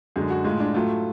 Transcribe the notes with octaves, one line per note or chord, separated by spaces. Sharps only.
F#2 D3 G#3 G#4
F#4
A2 G#3 F4
D4
A2 F#3 A3 F4